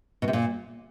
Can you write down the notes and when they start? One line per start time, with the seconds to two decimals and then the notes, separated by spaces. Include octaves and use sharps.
0.22 B2
0.28 C3
0.33 A#2